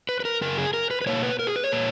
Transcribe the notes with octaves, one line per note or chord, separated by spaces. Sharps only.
B4
B4
A#4
F#2 C#3 A#4
G#4
A#4
B4
B4
B2 A#3 C#5
B4
A#4
G#4
B4
C#5
A#2 A#3